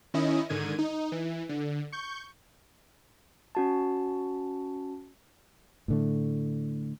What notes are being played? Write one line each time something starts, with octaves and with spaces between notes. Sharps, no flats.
D#3 C#4 E4 D#5
G#2 D3 D#3 G#6 D#7
D#4
E3
D3
C#6 G6
C#4 F#4 A5
A2 D3 A3